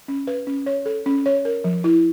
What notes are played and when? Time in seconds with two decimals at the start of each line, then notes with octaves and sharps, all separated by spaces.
0.08 C#4
0.27 B4
0.47 C#4
0.66 C#5
0.86 A4
1.06 C#4
1.26 C#5
1.45 A#4
1.64 F3
1.84 E4